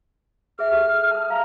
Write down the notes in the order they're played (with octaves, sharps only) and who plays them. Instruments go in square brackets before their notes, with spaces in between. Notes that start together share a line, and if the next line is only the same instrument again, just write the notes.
[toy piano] G#4 E5 [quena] F6
[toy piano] G4 A4
A5 D#6
[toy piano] F5 [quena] A#5